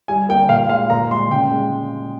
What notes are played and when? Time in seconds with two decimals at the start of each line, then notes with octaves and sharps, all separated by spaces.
0.08 G3 G#5
0.29 A#3 G5
0.49 A#2 F5
0.69 G#3 F5
0.90 A#2 A#5
1.11 G#3 C6
1.30 C#3 G5
1.51 G#3